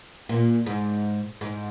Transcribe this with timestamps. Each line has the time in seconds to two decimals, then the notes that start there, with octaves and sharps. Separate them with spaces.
0.29 A#2
0.66 G#2
1.41 G#2